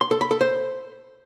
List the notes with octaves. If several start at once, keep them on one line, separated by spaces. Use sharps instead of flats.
C6
A4
B5
A4
C5